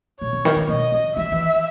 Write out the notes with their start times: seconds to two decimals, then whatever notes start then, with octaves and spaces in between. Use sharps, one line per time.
0.20 B2 C#5
0.33 B2
0.45 D#3
0.57 D#3
0.68 B2 D#5
0.92 C#3
1.16 E3 E5
1.32 E3